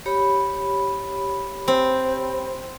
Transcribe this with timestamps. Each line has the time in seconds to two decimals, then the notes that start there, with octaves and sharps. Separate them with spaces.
0.06 G4 C#5 B5
1.68 C4